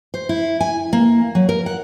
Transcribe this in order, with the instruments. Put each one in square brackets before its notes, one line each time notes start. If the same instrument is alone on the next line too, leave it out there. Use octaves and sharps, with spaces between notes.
[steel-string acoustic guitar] C5
E4
G#5
A#3
F#3
A#4
F#5